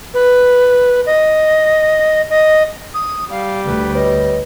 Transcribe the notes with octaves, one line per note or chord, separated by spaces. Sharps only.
B4
D#5
D#5
D#6
G3 F5
D2 B4
B4 C#5 D#5